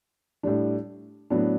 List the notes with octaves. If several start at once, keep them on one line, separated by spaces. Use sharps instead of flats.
A2 G3 D4
A2 F#3 B3 D4